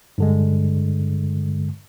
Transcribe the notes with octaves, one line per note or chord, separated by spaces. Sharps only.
G2 D3 G#3